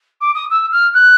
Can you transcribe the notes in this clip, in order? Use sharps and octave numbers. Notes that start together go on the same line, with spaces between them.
D6
D#6
E6
F6
F#6